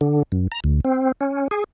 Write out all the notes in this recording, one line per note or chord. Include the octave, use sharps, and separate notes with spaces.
D3
F#2
A#5
D2
C4
C#4
G#4